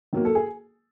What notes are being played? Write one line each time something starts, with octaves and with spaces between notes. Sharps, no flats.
D#3 F#3 A#3
A4
G#4